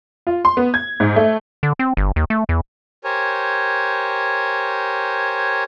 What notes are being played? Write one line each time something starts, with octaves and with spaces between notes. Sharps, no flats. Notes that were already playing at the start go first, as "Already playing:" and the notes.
F4
C6
B3
G#6
G#2
A3
D3
C4
G1
D#2
A3
E2
G4 A#4 C5 C#5 G#5